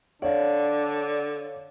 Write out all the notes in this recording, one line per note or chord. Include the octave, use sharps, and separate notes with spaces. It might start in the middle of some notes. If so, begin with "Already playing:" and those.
D3 D4 C#5 D5 F5 F#5